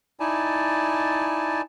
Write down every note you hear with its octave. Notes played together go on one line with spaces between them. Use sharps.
D#4 E4 D5 G#5 A5